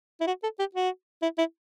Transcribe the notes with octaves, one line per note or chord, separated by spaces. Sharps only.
E4
F#4
A4
G4
F#4
E4
E4